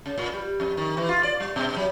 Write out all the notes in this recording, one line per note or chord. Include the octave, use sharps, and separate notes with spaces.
C#3
A#2
G3
F2
D#3
E3
F4
D5
G3
B2
F#3